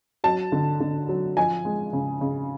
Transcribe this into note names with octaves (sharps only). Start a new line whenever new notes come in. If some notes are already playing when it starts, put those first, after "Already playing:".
F#3 A5
D3
D3
F#3
F3 G#5
G#3
C#3
C#3